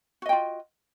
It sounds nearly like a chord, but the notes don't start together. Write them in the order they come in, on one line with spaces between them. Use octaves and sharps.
F#4 D#5 G5 F4